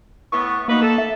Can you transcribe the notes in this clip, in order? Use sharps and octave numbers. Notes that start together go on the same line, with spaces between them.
A2 B3 C#6
A#3 D#4 F#4 B4
A4
E5